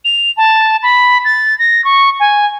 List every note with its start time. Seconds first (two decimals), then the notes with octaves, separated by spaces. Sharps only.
0.05 F7
0.37 A5
0.83 B5
1.25 A6
1.59 A#6
1.84 C#6
2.20 G#5